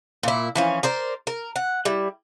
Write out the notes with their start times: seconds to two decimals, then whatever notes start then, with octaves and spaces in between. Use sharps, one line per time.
0.23 A#2 E4
0.55 E3 F3 C#4
0.83 A#4 C5 D5
1.27 A#4
1.56 F#5
1.85 G3 E4